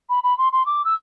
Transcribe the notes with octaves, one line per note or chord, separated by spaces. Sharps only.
B5
B5
C6
C6
D6
E6